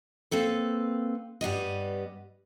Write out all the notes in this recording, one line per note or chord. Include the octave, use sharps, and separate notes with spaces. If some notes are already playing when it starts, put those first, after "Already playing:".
A#3 C4 A4 B4
G2 G3 B3 D#5